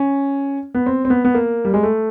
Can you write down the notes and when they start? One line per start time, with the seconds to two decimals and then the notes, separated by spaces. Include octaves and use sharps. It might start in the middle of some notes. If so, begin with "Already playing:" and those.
Already playing: C#4
0.74 B3
0.86 C4
1.05 C4
1.10 B3
1.25 B3
1.35 A#3
1.65 G3
1.74 G#3
1.83 A3